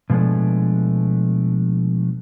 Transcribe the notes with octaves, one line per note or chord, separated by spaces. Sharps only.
B2 F3 G#3 A3 D4